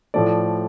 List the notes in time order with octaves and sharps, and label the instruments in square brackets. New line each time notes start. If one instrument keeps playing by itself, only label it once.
[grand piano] A2 F3 A3 D5